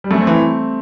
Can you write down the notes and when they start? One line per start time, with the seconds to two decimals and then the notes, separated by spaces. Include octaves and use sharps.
0.04 G3
0.10 F#2 A3
0.21 C4
0.27 E3